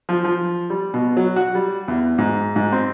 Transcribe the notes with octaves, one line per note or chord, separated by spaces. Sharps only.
F3
F3
G3
B2
F#3
F#4
G3
E2
G#2
G#2
C4